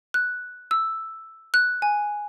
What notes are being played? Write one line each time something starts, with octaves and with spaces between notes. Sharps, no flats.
F#6
E6
F#6
G#5